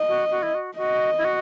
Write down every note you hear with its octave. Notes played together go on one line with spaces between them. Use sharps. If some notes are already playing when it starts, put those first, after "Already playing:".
Already playing: D#5
F#4
F#4
E4
F#4
F#4 D#5
E4
F#4